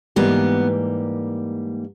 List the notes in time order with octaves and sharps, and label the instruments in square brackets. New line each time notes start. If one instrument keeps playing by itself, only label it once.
[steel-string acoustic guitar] G#2 E3 G3 A#3 B3